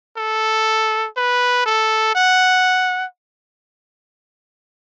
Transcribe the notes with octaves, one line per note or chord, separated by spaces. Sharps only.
A4
B4
A4
F#5